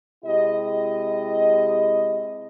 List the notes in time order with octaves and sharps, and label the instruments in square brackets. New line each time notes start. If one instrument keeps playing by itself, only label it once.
[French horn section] C3 G#3 E4 G4 D#5